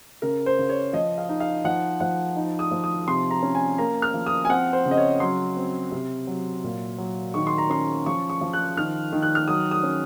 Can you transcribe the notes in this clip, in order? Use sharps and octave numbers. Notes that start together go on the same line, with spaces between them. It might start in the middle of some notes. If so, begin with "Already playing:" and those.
C#3 A#4
C5
C#3
C#5
F3 D#5
F5
D#4
F5
F3 F#5
F3 F#5
D#4
D#6
F3
D#6
C3 C6
A#5
C#4
G#5
A#3 A#5
F6
F3
D#6
G#5
C4 F#5
C5
C#3
D#5
C#5
F#3 C6
C4
C3
F#3
A#2
F#3
D#3 C#6
C6
A#5
C#4 C6
F3 C#6
C#6
F3
F#6
D#3 F6
D#3
F#6
F6
F#3 D#6
D#6
C#4